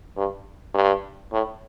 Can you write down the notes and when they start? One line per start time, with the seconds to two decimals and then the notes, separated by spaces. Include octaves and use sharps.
0.17 G2
0.74 G2
1.32 A2